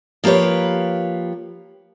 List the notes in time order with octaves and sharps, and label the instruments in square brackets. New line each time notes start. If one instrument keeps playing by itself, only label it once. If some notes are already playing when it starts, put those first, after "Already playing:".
[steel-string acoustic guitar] F3 A#3 G4 B4 C#5